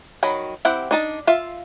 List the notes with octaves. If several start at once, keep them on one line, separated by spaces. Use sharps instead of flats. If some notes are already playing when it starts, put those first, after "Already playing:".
D#3 F#3 B5
C4 E4 G4 F#5
D4 D#4 A5
F4 E5 F5